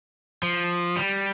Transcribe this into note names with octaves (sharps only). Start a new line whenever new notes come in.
F3
G3